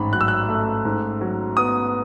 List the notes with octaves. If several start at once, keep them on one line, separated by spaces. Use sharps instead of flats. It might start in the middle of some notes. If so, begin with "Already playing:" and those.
Already playing: A1 G#2 B5
F#3 F#6
E6
F#6
A3
G#2
F#3
B3 D#6